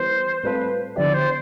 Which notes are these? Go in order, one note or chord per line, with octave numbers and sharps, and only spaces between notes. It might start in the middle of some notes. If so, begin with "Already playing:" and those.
Already playing: E3 G3 B3 C5
A2 G3 C4 F4 A4 B4
D3 F3 B3 E4 G4 D5
C5